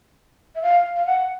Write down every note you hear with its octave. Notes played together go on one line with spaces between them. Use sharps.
E5
F5
F5
F#5